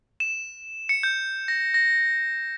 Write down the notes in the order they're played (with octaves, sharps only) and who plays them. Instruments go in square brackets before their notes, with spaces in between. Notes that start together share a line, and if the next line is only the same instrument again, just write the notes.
[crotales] E7
C#7
G6
A#6
A#6